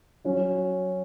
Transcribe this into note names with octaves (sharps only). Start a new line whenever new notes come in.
F#3 C#4 F#4